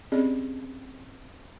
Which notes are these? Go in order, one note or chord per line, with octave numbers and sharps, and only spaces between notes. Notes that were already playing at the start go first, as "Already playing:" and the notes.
C4 C#4 G4 G#4 D5 D#5